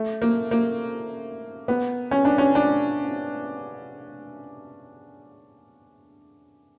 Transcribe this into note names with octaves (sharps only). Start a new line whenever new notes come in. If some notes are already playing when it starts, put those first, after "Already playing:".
Already playing: A3
A#3
A#3
B3
C#4
D4
C#4
D4